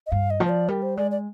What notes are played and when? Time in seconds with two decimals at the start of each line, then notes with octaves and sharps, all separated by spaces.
0.06 D#5
0.11 G2 F5
0.30 D#5
0.40 F3 C5
0.49 D5
0.68 G3 A#4
0.82 C5
0.97 G#3 D5
1.11 D5